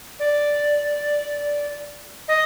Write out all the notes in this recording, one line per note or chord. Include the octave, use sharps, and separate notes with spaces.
D5
D#5